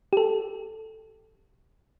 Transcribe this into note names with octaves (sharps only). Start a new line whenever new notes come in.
G4 A4